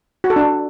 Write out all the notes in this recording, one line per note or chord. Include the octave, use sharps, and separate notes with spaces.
F#4
A4
D4